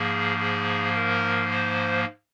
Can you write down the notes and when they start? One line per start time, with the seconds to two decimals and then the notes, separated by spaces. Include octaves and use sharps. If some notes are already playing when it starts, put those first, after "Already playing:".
Already playing: G#2 F3 A#3 G#4
0.40 G#4
0.95 A#4
1.50 C5